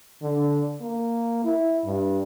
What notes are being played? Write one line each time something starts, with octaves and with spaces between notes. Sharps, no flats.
D3
A#3
E4
G2